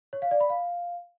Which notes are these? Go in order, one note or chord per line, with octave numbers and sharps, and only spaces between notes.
C#5
F5
D5
B5
F5